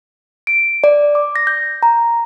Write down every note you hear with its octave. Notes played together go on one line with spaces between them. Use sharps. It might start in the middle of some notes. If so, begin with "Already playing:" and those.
D7
D5
D6
A#6
G6
A#5